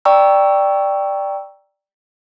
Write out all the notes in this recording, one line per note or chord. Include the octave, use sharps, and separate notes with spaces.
D5 G5 A#5 C#6 E6